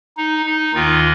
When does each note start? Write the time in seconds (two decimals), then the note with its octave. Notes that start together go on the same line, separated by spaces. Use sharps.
0.17 D#4
0.46 D#4
0.74 D#2 D#3 F4